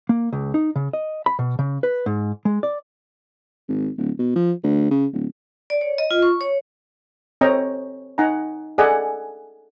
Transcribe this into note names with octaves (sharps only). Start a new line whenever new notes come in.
A#3
C#2
D#4
C#3
D#5
B5
B2
C#3
B4
G#2
G#3
D5
G#1
D1
B2
F3
D2
C#3
D1
D5
C#5
D#5
F4
C#6
C#5
C4 A4 C#5 D#5 G5 A#5
D#4 F#5 G#5 A#5
G#4 A4 D5 D#5 F#5 G#5